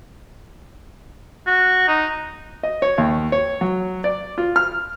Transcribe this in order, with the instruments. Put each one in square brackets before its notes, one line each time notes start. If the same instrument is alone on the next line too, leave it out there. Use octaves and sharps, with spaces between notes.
[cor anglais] F#4
D#4
[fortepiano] D#5
C#5
D#2
C#5
F#3
D5
F4
F6